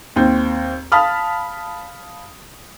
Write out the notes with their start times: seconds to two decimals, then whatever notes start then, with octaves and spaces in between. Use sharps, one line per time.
0.16 D#2 C4
0.92 F5 A5 B5 D#6 F6